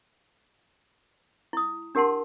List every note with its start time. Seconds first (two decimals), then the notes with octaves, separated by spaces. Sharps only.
1.53 E4 D#6
1.95 D4 G4 A#4 F#5 A5 C6